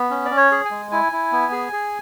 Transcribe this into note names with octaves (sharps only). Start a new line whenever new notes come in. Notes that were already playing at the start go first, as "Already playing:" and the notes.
Already playing: B3
C#4
D5
C#4
C#5
G#4
G#5
G#3
E4 G#5
E4
B3
G#4
G#4